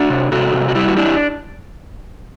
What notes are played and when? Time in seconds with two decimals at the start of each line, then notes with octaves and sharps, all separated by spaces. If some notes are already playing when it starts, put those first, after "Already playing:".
Already playing: D4 F#4
0.10 C3
0.32 C3 F#4 A4
0.54 C3
0.68 F#4
0.75 G3 E4 G4
0.88 F#4
0.97 D4 E4 G4